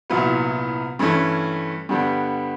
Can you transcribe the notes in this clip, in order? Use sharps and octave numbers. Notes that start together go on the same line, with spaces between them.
C2 A#2 F#3 B3 E4
G2 E3 A3 C#4
G2 D3 G3 B3